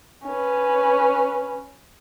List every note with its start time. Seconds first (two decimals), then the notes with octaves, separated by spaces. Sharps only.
0.25 C#4 B4